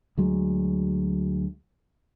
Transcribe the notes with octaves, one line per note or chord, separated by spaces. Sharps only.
D2 F#3 G#3